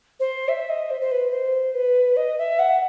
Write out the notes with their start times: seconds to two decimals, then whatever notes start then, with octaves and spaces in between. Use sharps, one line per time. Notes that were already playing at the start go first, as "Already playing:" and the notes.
0.20 C5
0.49 E5
0.70 D#5
0.91 C5
1.01 C5
1.11 B4
1.32 C5
1.75 B4
2.17 D#5
2.38 E5
2.59 F#5